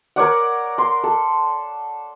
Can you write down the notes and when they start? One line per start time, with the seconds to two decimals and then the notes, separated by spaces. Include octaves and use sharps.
0.16 A#4 C#5 D5 F#5
0.78 C6
1.04 A4